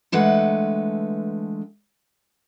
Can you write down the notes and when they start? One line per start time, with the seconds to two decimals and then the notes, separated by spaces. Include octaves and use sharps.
0.12 D3 E3 G#3 A3 B4 F#5